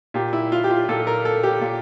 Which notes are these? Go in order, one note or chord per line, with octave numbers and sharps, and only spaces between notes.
A#2 G4
E4
F4
G4
F4
A#2 A4
A#4
A4
G4
A#2